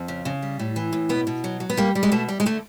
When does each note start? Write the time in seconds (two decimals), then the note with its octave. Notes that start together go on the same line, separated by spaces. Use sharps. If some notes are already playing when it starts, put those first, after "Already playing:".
Already playing: F2
0.08 C#3
0.25 C#3
0.42 G3
0.59 A2
0.76 E3
0.93 A2
1.09 B2 B3
1.27 B2
1.44 F#3
1.60 F#3
1.70 B3
1.77 G3 A#3
1.95 G3
2.03 G#3
2.12 B2 A3
2.28 G3
2.40 G#3
2.46 D3 A3